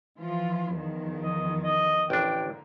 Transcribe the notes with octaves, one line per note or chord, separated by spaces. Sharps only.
E3 F3 F4
E2 D#3 F3
D#5
D#5
A1 D3 A#3 D4 G5